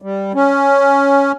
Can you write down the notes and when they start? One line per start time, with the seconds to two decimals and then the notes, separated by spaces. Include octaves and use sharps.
0.02 G3
0.34 C#4